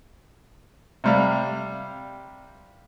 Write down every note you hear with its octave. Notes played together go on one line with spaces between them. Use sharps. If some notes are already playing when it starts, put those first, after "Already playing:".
C3 G3 F5